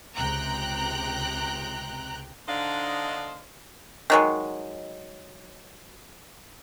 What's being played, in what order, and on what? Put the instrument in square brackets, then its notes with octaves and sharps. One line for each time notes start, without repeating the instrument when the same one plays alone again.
[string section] C#2 C3 G5 A#5 F#6
[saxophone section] D3 D4 D#4 C5 D#5 F5
[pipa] D#3 F#3 G#3